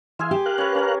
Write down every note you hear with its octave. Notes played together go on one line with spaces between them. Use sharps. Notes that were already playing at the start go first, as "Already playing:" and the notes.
E3 G#4 E5 F5 G#5 C6
G4
A#4 F5 F#6
C#4 B4
C#4 A#5